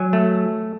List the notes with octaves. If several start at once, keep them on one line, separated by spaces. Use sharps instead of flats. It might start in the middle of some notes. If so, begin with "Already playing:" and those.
Already playing: F#3 G#5
A3